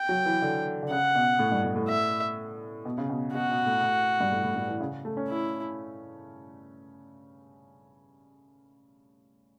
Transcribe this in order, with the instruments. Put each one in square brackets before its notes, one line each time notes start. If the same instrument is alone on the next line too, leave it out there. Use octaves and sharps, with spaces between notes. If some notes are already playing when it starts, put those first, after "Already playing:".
Already playing: [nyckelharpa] G5
[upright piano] F#3
E3
D3
D3
[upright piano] C#3 [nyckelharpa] F#5
[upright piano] B2
A2
G2
A2
A2
[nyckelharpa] E5
[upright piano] B2
C#3
B2
[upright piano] B2 [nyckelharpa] F#4
[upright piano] B2
A2
A2
G2
A2
A2
A2
E3
C#3
A3
C#4
[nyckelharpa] E4